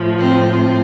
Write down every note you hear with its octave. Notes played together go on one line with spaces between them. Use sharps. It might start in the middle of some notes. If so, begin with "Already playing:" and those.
Already playing: A2 F3
C4
C4